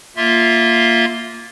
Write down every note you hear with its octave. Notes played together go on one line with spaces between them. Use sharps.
A#3 F4 E5 C6